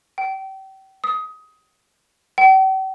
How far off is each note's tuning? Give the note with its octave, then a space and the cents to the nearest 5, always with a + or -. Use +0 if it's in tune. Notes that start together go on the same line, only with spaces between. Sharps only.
G5 -30
D#6 +20
G5 -45